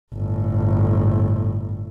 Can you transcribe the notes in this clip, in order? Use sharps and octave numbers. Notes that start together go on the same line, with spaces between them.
G1 A2